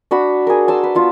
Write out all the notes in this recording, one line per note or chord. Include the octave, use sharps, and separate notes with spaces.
D4 F#4 F#5 B5
G#4 A#4
A5 C6 E6
B4
B3 F4 F#4